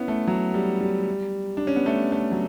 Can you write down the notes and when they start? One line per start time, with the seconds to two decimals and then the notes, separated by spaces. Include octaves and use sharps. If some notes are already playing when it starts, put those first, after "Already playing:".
Already playing: B3 C#4 E4
0.08 A3
0.27 F#3
0.54 G3
0.81 G3
1.57 D4
1.67 C#4
1.76 B3
1.86 A3
2.12 A3
2.32 F#3